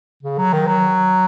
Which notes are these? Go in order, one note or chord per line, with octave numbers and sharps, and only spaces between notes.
C#3
F#3
D#3
F#3